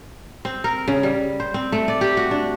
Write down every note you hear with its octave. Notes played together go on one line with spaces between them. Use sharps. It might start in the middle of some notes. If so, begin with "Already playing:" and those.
C4
A#4
C#3
G3
C5
C4
A3
D5
G4
F#4
D4